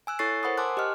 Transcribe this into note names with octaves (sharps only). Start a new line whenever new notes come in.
G#5 E6 F#6
E4 A4 C#5 C#6 A6 C7
A#4 C5 F#5 B5 D#6
G#5 A5 C6 D6 E6 F#6
G4 D#5 F6